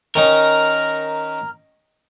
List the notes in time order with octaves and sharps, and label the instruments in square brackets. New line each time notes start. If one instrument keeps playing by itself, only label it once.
[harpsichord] D#3 C#4 D#4 [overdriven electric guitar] A#4